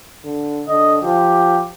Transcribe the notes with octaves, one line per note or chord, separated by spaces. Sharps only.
D3
D3 D#5
F3 G4